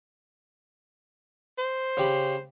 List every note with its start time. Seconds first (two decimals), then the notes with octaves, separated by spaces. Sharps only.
1.58 C5
1.97 C#3 G4 B5